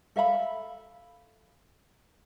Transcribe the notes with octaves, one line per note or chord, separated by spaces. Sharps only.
A4 E5 F5 B5